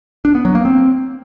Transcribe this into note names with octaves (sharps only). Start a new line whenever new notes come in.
D4
B3
F#3
A#3
C4